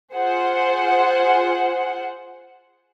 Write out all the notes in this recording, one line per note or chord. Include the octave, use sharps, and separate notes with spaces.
F4 G#4 C5 F#5